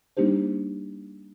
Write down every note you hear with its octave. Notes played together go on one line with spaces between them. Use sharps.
G3 A#3 D4 D#4 G4 C5